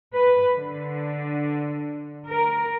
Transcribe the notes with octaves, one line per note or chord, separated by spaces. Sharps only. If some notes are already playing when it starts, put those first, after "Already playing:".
B4
D3
A#4